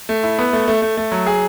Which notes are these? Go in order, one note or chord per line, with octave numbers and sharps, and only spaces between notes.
A3
E4
B3
A3
A3
A3
A3
F#3
G#4